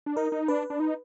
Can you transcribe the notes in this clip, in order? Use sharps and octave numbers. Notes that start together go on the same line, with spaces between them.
D4
D#4 A#4
D#4
D4 B4
D4
D#4